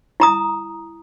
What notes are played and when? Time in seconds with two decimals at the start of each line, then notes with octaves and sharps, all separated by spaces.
0.20 E4 A#5 D#6